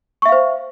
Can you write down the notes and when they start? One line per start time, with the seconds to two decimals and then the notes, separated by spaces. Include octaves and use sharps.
0.22 C#6
0.26 E5
0.29 F5
0.32 C5